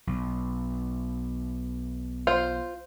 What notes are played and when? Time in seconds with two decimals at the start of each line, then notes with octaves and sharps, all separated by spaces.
0.07 B1
2.27 F4 C5